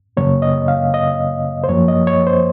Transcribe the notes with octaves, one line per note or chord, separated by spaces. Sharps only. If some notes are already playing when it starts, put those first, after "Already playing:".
F#2 C#3 F#3 A#3 C#5
D#5
F5
D#5
C5
F#2 F3 A#3 C#5
D#5
C#5
C5